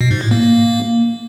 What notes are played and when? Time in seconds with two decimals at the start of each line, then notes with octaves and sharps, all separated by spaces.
0.01 B2
0.11 G#2
0.21 A2
0.31 A#3
0.42 A#3